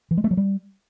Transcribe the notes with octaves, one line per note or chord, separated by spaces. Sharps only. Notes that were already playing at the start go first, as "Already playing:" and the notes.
E3
G#3
A3
F#3
G3